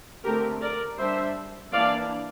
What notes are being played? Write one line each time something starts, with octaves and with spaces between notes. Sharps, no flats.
D3 A3 C4 G4 A#4
A#4 D5
G3 D4 C5 E5
E3 A#3 D4 D5 F5